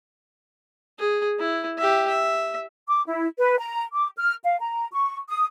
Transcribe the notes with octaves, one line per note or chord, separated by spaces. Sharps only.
G#4
E4
G4 E5
E5
D6
E4
B4
A#5
D6
F6
F5
A#5
C#6
D#6